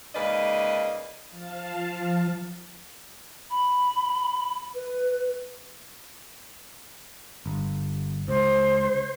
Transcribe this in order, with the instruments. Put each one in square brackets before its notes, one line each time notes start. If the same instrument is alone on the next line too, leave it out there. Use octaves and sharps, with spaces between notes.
[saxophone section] G#2 C#3 A#3 B4 D5 D#5
[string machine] F3 F5 A5
[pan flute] B5
B4
[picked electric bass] G1
[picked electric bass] C#2 [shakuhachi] C5